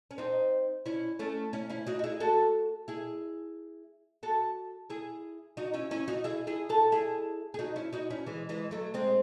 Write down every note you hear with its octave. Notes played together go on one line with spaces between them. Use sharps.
C#4
C4 D#4
C#4 E4
A3 C#4
C#4 E4
C#4 E4
D#4 F#4
F#4
E4 G#4
F#4 A4
E4 G#4
F#4 A4
E4 G#4
D#4 F#4
C#4 E4
C#4 E4
D#4 F#4
E4 G#4
E4 G#4
F#4 A4
E4 G#4
G#4
D#4 F#4
C#4 E4
D#4 F#4
C#4 E4
E3 G#3
E3 G#3
F#3 A3
G#3 C4